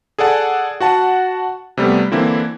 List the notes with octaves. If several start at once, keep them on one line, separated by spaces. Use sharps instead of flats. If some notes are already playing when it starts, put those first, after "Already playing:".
G#4 A4 D5 F#5 A5
F#4 F#5 A5
C3 G3 A3 B3
D3 E3 A#3 C4 E4